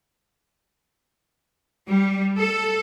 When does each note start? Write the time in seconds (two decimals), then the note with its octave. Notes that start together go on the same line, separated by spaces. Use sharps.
1.88 G3
2.37 A4